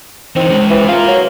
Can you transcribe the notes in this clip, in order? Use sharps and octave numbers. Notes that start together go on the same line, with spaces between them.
E3 C4 D#4
G#3 C#4
E3
F4 A#4 F5
F#3